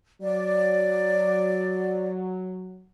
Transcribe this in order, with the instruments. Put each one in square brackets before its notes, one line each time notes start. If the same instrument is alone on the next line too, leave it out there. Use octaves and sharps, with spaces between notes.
[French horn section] F#3 [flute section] D5